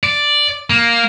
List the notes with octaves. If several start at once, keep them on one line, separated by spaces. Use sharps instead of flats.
D5
A#3